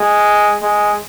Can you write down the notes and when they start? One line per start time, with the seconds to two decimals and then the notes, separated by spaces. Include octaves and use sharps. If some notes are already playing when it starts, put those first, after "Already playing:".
Already playing: G#3
0.62 G#3